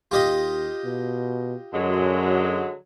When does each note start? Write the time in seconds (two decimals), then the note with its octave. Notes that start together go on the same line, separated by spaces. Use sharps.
0.11 D#2 F4 G4 D#5
0.84 B2
1.73 F#2 D3 F#3 G#3